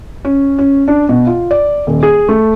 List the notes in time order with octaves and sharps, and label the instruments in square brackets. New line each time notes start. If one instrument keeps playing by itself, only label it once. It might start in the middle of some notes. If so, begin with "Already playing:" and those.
[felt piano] C#4
C#4
D4
B2
F4
D5
D#1
G#4
A3